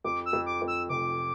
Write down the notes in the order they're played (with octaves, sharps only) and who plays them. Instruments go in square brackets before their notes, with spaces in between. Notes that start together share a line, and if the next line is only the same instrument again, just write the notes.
[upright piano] F2 [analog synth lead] D6
[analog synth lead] E6
[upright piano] F2
[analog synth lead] D6
[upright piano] F2
[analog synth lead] E6
[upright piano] F1 [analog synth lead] D6